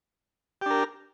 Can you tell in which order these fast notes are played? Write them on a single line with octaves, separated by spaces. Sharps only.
G4 D4 A#4